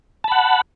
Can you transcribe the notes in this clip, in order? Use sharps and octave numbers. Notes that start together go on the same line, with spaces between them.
F#5 A5 B5